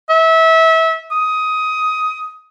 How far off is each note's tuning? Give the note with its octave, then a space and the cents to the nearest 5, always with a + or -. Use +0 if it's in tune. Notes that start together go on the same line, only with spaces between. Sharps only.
E5 -25
D#6 +15